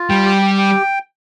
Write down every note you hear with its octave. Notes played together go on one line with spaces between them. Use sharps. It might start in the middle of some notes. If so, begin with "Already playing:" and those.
Already playing: F4
G3 G5
G4
G4
G5